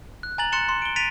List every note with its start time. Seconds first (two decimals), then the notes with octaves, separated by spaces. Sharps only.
0.23 F#6
0.38 G#5 A#5 A6 F#7
0.52 C6 F#6 A6 C#7 E7 G7
0.69 C6
0.82 D7 G7
0.96 A6 B6 D7 D#7 F7